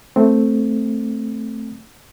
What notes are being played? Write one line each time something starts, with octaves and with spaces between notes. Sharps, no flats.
A3 C4